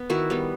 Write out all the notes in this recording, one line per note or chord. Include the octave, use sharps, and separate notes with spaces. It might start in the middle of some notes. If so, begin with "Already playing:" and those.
Already playing: B3
D#3 E4 F#4
G3 B3